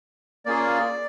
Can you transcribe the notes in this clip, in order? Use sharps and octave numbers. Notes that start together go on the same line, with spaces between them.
A#3 C#4 F4 G#4 D5